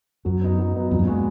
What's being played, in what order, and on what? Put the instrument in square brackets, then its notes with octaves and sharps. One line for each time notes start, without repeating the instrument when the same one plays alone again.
[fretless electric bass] F#2 [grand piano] F#3
[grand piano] B3 D#4
F#3
B3 D#4
[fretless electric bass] F2 [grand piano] A#2
[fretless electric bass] F#2
[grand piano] G#3 B3 F#4